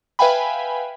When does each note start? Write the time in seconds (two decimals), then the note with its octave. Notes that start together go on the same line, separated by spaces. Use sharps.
0.19 B4 E5 F5 G5 G#5 B5